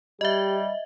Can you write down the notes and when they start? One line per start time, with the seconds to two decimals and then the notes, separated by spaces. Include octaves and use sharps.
0.21 G3 G4 D#5 E5